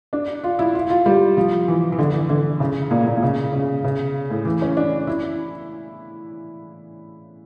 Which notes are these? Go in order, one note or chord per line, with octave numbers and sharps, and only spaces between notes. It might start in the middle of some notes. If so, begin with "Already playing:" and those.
D4
F4
E4
F4
F4
G3
F3
E3
E3
D3
E3
D3
C#3
A#2
A#2
A#2
C#3
C#3
C#3
A2
E3
C#4
D4
E4